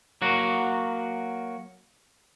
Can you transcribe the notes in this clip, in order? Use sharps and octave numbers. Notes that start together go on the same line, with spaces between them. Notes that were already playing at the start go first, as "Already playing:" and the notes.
F#3 A#3 F#4